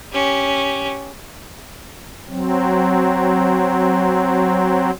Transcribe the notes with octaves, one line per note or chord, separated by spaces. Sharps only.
C#4 G4
F#3 C4